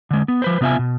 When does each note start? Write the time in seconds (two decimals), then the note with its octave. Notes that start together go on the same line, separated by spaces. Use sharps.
0.11 D3 G#3
0.28 B3
0.42 F3 B4 C5
0.61 C3 B3 F4 E5 F5 G#5
0.79 B2